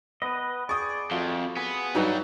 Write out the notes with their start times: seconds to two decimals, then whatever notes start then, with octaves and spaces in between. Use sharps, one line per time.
0.22 B3 B4 D#5
0.69 G#4 D5 G5 C#6 D#6
1.11 F2 A3 F4 F#4
1.57 B3 G#4
1.95 G2 F#3 G3 D#4 F#4 B4 A#5